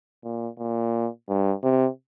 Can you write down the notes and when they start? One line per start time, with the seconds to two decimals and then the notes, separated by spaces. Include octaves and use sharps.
0.24 A#2
0.59 A#2
1.29 G2
1.63 C3